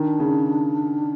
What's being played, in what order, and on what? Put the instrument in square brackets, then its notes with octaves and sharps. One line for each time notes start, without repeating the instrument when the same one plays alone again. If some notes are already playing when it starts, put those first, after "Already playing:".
Already playing: [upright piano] D#3 [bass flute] D4
[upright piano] C#3